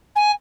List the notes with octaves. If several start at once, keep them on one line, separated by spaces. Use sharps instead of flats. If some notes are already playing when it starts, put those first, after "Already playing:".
G#5